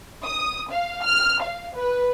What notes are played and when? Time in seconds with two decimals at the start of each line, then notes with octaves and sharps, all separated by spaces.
0.25 D#6
0.70 F5
1.05 F6
1.42 F5
1.77 B4